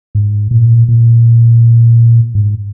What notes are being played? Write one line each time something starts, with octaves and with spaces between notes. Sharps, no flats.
G#2
A#2
A#2
G#2